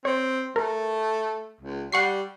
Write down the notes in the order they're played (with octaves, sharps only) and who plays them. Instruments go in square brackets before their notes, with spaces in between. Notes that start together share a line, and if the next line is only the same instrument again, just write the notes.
[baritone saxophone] C4 [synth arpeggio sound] C#5
[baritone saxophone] A3 [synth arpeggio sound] A#4
[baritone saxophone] C#2
[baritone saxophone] G3 [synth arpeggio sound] F#5 C#6 C7